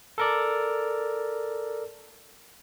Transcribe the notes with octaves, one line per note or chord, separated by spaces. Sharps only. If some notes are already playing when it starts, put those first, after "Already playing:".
A4 A#4 D5